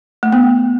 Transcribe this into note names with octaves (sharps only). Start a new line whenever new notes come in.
A3
B3